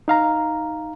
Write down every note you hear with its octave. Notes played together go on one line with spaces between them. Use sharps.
D#4 F5 A#5